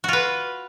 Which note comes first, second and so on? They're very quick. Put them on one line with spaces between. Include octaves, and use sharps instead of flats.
F#4 F4 B4